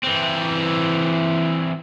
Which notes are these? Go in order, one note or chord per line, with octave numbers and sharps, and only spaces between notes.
E3 C4